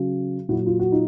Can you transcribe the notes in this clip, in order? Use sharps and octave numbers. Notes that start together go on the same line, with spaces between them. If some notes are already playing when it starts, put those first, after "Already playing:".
Already playing: C#3 F#3
A#2 F#3 E4 F#4
F4
F#4
D#4 F4